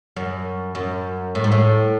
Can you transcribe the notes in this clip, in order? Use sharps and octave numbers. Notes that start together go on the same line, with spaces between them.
F#2
F#2
A2
G#2
A2